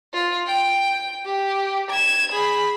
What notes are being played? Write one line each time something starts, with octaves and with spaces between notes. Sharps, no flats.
F4
G5
G4
G#6 E7
G#4 B5